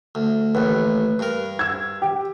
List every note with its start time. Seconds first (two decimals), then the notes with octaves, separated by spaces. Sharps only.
0.15 D2
0.55 A1 D#2 B4
1.19 G2 A#4
1.59 E6 G#6
2.02 G4